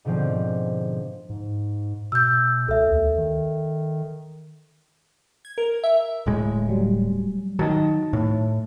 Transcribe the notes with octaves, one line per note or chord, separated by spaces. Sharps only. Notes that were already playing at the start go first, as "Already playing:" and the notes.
G#2 B2 D3 F3 C4
G#2
B2 E6 G6
C#2 A4 E5
D#2
D#3
G#6
A#4
E5
D1 A2 G#3
F#3 G3
D#3 F#3 D#4 A5
A2